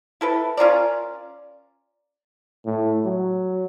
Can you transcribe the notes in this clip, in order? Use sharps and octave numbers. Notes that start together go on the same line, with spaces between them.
E4 A4 B4
C#4 F4 A#4 D5
A2
F#3